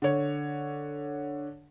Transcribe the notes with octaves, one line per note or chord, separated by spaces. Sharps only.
D3 C#5